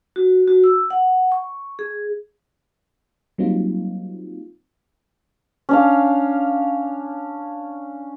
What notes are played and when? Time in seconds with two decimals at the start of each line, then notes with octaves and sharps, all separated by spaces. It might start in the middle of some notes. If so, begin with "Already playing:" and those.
0.16 F#4
0.48 F#4
0.64 E6
0.91 F#5
1.32 C#6
1.79 G#4
3.38 F#3 G3 A#3 C4 D#4 F4
5.69 C#4 D4 F5